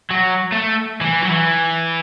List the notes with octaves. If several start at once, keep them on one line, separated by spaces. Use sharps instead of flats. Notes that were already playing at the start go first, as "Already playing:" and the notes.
F#3
A3
E3
F#3
E3